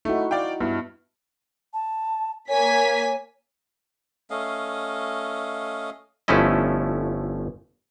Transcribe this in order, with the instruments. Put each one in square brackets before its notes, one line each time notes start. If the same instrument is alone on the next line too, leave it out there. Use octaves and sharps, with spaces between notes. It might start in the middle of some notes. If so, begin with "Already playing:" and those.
[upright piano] A3 [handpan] D#4 E4 F#4
[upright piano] D5 F5 G5
[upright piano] G2 [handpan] B3 E4
[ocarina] A5
[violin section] A#3 G#5 B6 [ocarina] C#5
[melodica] A3 C#4 D#5 F5
[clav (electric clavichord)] G1 F3 A3 C#4 E4 D#5